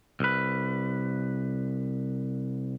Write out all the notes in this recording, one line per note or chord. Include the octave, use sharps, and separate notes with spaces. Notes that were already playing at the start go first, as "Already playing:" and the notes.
C2 B4